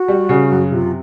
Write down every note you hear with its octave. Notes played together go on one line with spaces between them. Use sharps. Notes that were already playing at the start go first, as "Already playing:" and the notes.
Already playing: F#4
G3
C#3
F#2
C3 F4